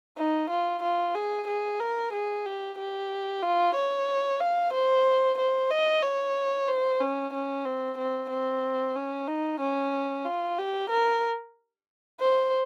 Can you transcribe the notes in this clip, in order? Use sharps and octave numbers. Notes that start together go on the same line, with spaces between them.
D#4
F4
F4
G#4
G#4
A#4
G#4
G4
G4
F4
C#5
F5
C5
C5
D#5
C#5
C5
C#4
C#4
C4
C4
C4
C#4
D#4
C#4
F4
G4
A#4
C5